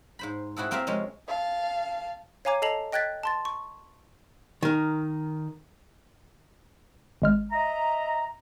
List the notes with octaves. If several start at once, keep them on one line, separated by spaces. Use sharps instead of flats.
G#2 C5 B5
C4 E4 F#4 G#4 A4
A#3 C4 G4 A#4 E5 F5
C3 F3 G#3 A#3 C#4
F5 A5
C#5 F5 G#5 A#5 D6 G#6
A4 D#5 A5 C7 F7 F#7
D#5 G5 F#6 G#6 A6 B6
A5 C6 A6
C#6
D#3 A#4
G#1 G#3 F6
D#5 E5 A#5